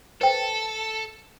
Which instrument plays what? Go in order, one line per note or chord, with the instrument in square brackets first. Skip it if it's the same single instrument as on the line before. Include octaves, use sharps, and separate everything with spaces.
[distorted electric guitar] A4 [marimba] B4 C5 G5